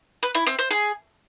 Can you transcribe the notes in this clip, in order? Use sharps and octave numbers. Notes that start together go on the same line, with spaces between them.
B4
E4
C4
C5
G#4